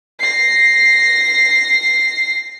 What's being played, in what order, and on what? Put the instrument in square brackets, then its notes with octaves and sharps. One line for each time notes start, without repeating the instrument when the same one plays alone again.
[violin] A#6 C7